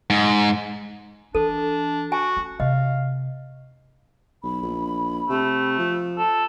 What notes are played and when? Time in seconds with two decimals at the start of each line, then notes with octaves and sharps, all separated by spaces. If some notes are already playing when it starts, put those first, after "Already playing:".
0.10 G#2
1.35 E3 D4 A4
2.12 F#4 G#5
2.37 C#4
2.60 C3 D#5 F5
4.43 B1 B5
4.62 A#1
5.30 C3 A3
5.79 F3
6.18 A4